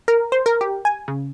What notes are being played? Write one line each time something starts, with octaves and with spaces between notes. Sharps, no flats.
A#4
C5
A#4
G4
G#5
C#3